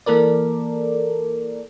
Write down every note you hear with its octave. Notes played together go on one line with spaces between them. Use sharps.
E3 A#3 A4 A#4 D5